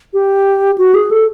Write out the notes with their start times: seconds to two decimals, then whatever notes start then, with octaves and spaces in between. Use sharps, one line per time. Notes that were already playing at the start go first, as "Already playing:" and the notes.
0.13 G4
0.78 F#4
0.94 G#4
1.11 A4